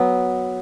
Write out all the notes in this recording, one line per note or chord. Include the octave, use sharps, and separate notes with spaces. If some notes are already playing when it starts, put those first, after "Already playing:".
Already playing: F#3 B3